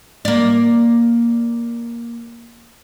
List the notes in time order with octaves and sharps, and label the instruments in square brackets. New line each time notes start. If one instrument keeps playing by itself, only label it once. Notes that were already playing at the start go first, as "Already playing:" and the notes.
[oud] A#3 D5